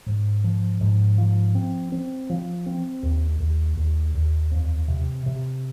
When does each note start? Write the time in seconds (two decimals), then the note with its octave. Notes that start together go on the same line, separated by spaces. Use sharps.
0.06 G#2
0.44 F3
0.81 G#2
1.18 F3
1.55 C4
1.92 C4
2.30 F3
2.66 C4
3.03 D#2
3.40 D#2
3.77 D#2
4.15 D#2
4.51 F2
4.88 C3
5.26 C3